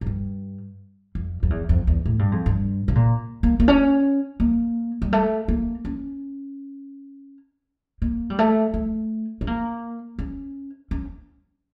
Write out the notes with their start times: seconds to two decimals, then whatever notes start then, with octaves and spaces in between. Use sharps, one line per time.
0.01 F2
0.06 G2
1.15 F2
1.43 F2
1.50 E2
1.69 F2
1.87 E2
2.05 A2
2.19 G2
2.32 F2
2.46 G2
2.88 C#3
2.95 A#2
3.43 A#3
3.60 A#3
3.68 C#4
4.40 A#3
5.02 G3
5.13 A3
5.48 A#3
5.85 C#4
8.02 A#3
8.30 G3
8.39 A3
8.74 A3
9.41 C#4
9.47 A#3
10.19 C#4
10.91 C#4